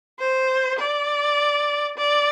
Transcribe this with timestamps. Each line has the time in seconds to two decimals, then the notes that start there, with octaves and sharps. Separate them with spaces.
0.19 C5
0.79 D5
1.98 D5